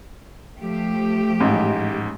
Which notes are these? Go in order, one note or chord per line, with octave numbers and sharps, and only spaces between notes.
F3 A3 G4
A1 G#2